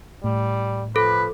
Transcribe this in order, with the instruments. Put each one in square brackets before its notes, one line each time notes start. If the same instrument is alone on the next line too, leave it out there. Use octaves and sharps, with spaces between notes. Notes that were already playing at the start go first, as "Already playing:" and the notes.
[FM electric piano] A2 [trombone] G3
[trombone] F3 [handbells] A4 [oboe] B4